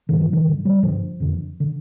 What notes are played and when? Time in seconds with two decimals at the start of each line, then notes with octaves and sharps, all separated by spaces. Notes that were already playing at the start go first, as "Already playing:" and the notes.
0.09 G2 D3 D#3
0.21 F3
0.33 D#3
0.46 G2 D3
0.65 G3
0.83 G2 D3 F3
1.20 F2 D3
1.60 D3